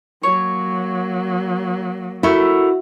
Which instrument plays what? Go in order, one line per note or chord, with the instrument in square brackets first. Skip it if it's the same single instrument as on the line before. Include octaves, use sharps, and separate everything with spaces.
[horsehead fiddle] F#3 A#3 [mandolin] C#5
[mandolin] A3 A#4 [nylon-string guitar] E4 [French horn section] F#4